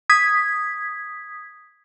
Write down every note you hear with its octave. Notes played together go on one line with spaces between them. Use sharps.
D#6 G#6 B6